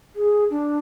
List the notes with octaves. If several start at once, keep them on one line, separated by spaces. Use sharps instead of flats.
G#4
D4